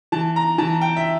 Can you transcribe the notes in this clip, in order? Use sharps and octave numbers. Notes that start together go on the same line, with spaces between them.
E3 A5
A#5
E3 A5
G5
E5